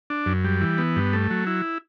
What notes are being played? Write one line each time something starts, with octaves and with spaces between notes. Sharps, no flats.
D4
F#2
G3
E3
B3
G2
A3
F#3
E4